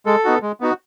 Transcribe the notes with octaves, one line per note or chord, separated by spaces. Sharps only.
G#3 A4
B3 D#4 F#4
G#3
B3 D#4 F#4